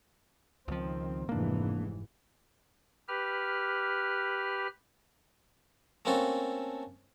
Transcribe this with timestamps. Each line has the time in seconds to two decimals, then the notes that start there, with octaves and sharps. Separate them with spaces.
0.68 C#2 D#3 F3 C4
1.29 F1 G#2 E3 A#3 D4
3.08 G4 B4 F6
6.05 A3 A#3 C4 C#4 F#4 A4